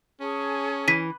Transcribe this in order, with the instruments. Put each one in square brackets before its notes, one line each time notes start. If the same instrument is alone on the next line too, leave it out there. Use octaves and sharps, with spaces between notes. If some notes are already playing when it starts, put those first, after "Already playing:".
[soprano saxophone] C#4 [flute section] G#4 A5 C#6
[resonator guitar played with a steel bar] E3 [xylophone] B6 D#7